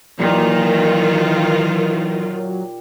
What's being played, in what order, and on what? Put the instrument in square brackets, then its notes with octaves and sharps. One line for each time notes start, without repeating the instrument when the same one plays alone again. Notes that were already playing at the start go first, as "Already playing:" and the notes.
[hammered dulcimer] A#2 G4 [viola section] D#3 F4 [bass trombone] E3 [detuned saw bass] F#3